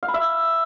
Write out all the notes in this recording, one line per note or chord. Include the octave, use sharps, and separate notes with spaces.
F5
B5
E5